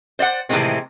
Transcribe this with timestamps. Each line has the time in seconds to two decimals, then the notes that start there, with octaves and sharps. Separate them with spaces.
0.19 C5 D5 E5 F#5
0.49 A2 C3 D#3 E3 G#3 C4